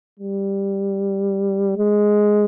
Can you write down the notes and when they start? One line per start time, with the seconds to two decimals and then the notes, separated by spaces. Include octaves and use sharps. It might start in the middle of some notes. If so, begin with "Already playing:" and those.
0.20 G3
1.77 G#3